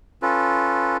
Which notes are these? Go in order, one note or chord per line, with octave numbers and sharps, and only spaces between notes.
C#4 F4 A4 B4